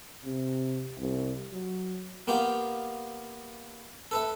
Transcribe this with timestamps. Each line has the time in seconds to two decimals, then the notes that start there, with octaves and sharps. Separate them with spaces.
0.24 C3
0.99 C2
1.52 F#3
2.27 A#3 B3 F4 G4
4.11 A4 B4 E5